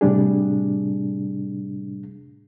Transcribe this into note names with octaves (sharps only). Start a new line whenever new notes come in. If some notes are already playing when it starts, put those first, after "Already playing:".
A2 C3 G3 D4 G#4